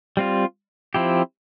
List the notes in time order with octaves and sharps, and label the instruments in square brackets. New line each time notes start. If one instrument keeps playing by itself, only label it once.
[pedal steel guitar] G3 C4 F4
F3 C4 E4 G4